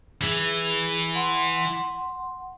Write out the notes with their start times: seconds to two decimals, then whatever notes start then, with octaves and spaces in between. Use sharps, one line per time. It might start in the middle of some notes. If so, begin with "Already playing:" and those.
0.22 E3 G#4
1.15 F#5 C6